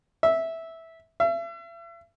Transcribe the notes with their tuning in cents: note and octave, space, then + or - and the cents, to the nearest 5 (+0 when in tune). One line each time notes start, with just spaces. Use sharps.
E5 -10
E5 +40